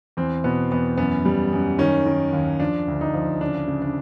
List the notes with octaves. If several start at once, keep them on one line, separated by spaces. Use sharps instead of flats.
E2 C4
B2 B3
E2 B3
F#2 B3
G3
F#2
D#3 C#4
D#3
D#2
F3 D4
D2
D#4
F3
C#3 D4
C#3
D4